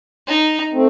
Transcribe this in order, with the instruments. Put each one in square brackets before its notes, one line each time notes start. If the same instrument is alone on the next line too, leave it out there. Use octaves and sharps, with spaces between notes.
[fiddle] D#4
[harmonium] A3 C4